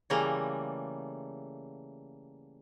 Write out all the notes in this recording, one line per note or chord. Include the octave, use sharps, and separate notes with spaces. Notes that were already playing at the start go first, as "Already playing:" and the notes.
C#3 E3 G3 A3 A#3 A#5